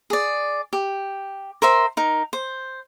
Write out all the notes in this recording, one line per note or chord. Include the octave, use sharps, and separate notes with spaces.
G#4 D5
G4
A#4 C5 E5 C6
D#4 A#4
C5